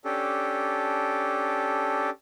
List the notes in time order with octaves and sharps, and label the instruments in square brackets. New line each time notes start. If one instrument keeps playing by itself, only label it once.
[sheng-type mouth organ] C#4 D4 G4 A4